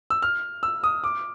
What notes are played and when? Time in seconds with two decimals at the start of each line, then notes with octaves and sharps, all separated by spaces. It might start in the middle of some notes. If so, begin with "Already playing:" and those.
0.10 E6
0.22 F6
0.63 E6
0.84 D#6
1.04 D6